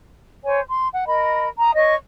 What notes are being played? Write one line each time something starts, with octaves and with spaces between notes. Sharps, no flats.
C5 C#5 G#5
C6
F#5
A#4 D#5 B5
A#5 D#6
C#5 D#5 C#6